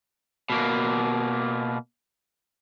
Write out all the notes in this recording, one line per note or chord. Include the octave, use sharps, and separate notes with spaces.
B2 A#3